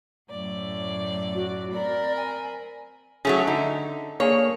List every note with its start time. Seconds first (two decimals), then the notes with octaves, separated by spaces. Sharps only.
0.29 F#2 A2 D5
1.35 F#4
1.73 C4 A#4 D5 B5
2.17 G#5
3.25 F#3 A3 C#4 G#4
3.47 D3 D#4
4.20 A#3 D4 G#4 C#5